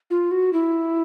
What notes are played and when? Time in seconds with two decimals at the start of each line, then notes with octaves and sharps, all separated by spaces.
0.10 F4
0.31 F#4
0.53 E4